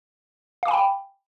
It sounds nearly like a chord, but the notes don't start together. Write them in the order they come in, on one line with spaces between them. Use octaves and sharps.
F5 D6 G#5 B5 G5